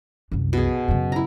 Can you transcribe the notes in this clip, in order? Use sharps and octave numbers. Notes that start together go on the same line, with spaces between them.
C2 F#2
B2 G#4
F#2 C#3
E4 A#5